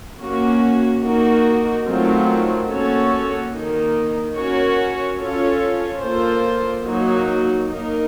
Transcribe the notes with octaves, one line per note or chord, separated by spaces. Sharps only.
A#3 C#4 F#4
A#3 D#4 F#4 A#4
D#3 F#3 A3 C4 F4
A#3 C#4 F#4 A4 C#5
D#3 A#3 D#4
C#4 F#4 A#4 C#5
C#4 F4 A4 C#5
A#3 F4 A4 C5
F#3 A#3 D#4 F#4
A#3 D#4 A#4